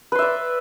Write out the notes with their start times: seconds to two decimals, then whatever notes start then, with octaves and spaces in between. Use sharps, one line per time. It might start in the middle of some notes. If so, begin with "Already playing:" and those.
0.12 B4
0.15 C6
0.19 E5
0.22 D5